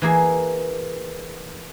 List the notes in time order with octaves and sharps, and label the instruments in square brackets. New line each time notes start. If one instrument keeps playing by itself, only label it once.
[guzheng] E3 A#3 G#4